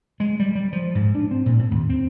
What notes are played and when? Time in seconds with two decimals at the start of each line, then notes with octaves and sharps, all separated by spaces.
0.20 G#3
0.39 G3
0.55 G3
0.73 F3
0.95 G#2
1.15 D4
1.31 C4
1.46 A#2
1.59 A2
1.71 D#2
1.89 C4